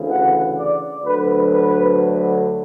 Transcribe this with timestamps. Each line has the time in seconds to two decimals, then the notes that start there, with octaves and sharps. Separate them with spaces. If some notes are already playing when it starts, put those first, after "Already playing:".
Already playing: D2 C#3 E3
0.11 F#5
0.59 D5
1.04 D2 D3 F#3 B4
1.51 B4